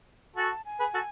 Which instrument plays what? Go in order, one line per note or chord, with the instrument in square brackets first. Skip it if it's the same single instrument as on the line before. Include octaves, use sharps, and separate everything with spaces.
[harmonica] F#4 A4 [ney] G#5
[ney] A5
G#5
[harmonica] G#4 B4
F#4 A4